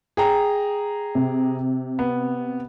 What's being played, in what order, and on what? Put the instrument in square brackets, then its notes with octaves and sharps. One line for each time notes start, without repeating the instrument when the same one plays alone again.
[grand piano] G#4 G5 A#5
[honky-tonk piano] C3
[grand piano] B3